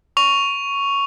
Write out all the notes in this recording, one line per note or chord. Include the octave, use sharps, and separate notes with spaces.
C#6 F7